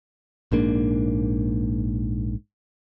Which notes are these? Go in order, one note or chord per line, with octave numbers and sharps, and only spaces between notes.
A#1 G#2 A#3 D4